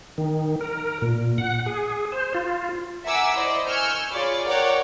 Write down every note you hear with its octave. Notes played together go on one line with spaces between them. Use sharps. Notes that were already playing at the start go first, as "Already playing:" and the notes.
D#3
A#4
A#2
F#5
G#4
C5
F4
E5 F#5 G#5 A#5 D6 E6
E4 C5 D5 D#5
G#5 C#6 E6 F6 G6
F4 G#4 C#5 D5 B5 C#6
A#4 C#5 D5 F#5 G5 A#5